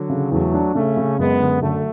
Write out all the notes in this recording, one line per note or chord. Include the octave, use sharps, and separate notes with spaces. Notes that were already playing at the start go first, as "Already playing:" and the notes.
Already playing: D3 F#3
C#3
E2 F#3 A3
D4
C#3 A3 C#4
C#3
F#2 G#3 B3
D3
D3 F#3 A3